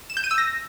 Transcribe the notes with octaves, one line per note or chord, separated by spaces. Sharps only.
E7
G6
D#7
E6
A#6